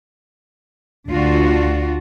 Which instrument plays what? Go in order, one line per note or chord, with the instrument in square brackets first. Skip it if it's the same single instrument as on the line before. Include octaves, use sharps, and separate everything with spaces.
[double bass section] D2 [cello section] D4 F4 F#4